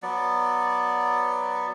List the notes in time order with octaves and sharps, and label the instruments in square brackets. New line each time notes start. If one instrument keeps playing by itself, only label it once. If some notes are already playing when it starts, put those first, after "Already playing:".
[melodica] F#3 B3 D5